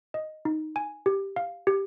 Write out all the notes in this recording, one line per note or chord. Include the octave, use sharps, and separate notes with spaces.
D#5
D#4
G#5
G4
F5
G4